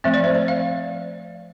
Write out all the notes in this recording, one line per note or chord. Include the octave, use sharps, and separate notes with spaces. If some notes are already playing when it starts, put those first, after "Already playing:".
F3 A3 C4 E5
D5
C5
D5
F5